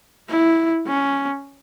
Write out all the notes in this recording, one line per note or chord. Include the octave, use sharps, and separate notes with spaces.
E4
C#4